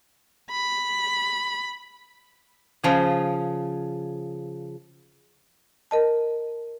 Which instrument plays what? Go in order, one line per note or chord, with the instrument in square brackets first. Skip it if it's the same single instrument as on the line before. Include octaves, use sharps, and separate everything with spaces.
[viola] B5
[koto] C#3 F3 G#4
[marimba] A#4 D#5 A5